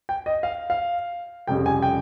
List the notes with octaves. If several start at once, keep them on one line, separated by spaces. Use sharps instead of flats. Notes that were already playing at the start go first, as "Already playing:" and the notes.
G5
D#5
F5
F5
F1 F2 C#3 G3 G5
G#5
G5